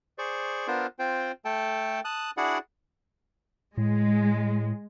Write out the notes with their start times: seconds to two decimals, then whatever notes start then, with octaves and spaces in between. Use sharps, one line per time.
0.18 G#4 C5 D5 C#6
0.67 B3 D4 F4 A#4 C5
0.99 C4 F4 C5 G5
1.45 A3 A4 G5 A5
2.05 A5 D#6 F#6
2.37 D4 E4 F#4 G#4 D5 F#5
3.77 A2 G#3